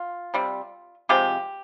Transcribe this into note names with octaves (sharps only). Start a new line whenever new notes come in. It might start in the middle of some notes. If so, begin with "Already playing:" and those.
Already playing: F4
C3 G3 C4
C3 F3 G#3 G4